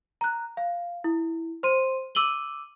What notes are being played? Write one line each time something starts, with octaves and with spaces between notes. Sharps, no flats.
A#5 F#6
F5
E4
C5 C6 D#7
D6 E6 D#7 F#7 G7